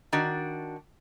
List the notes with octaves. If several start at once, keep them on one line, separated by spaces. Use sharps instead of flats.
D#3 D4 F#4